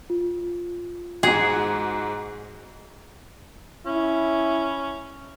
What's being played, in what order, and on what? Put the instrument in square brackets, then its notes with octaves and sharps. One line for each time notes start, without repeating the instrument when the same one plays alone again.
[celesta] F4
[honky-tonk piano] G#2 F#4 [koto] G#4
[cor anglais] C#4 [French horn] E4